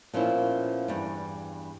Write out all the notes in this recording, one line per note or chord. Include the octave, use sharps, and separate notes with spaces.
A#2 F3 B3 C#4 E4
E2 G2 G3